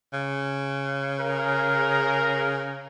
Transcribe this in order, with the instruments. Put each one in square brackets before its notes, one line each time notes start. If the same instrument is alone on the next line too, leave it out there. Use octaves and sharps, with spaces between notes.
[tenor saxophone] C#3
[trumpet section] G#4 A#4